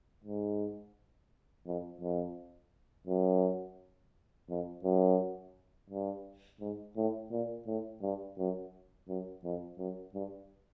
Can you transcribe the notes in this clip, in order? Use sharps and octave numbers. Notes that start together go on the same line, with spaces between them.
G#2
F2
F2
F#2
F2
F#2
G2
G#2
A2
A#2
A2
G2
F#2
F#2
F2
F#2
G2